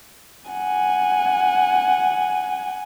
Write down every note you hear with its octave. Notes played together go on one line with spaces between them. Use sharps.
F#5 G#5